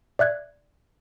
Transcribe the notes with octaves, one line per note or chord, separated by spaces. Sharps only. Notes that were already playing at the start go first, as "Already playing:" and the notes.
D5 E5 F#6 G#6